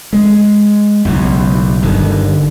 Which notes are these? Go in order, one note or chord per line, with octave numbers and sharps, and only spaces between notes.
G#3
B1 E2 C#3
G1 D3 D#3